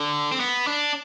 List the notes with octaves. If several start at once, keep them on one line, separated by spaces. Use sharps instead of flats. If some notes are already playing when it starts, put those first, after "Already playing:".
Already playing: D3
C4
B3
D4